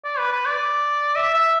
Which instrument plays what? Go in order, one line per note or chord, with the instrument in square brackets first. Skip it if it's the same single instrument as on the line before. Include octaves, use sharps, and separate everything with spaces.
[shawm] D5
B4
B4
D5
E5
E5